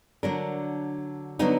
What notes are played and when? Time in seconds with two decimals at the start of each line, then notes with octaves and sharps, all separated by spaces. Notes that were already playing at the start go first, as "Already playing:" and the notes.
0.23 D3 F#3 D4 A#4
1.39 D3 F#3 B3 D#4 F#4